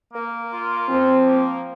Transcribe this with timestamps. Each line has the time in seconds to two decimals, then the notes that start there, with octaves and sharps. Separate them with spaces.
0.13 A#3
0.51 F4
0.88 F3 C4
1.27 A#3